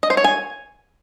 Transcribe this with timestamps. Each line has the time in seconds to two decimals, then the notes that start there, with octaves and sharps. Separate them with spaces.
0.03 D#5
0.10 C5
0.17 C#5
0.24 G#5